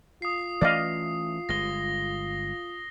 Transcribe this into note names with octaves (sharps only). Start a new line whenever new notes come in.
F4 D#6 C7
E3 A3 C#4 D5 D#5 F5
G1 G#3 A#6 G7